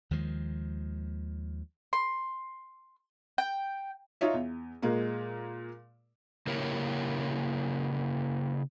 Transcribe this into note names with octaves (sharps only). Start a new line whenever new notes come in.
D#2 D#3 F3 G#3
C6
G5
D#4 F4 C#5 E5
E2
A#2 G#3 A#3
C#3 A#3 E4 G4 A#4 C#5